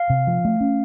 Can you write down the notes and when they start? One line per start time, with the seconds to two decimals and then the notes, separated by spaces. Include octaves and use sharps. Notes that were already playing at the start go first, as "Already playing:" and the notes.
Already playing: F5
0.10 C3
0.27 F3
0.45 A3
0.61 C#4